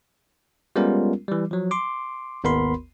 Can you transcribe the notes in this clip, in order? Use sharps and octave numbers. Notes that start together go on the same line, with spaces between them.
G3 G#3 B3 C#4 F4 A#4
E3 G3
F3 F#3
C6 D6
G#1 D#2 B3 A#4 B5 C6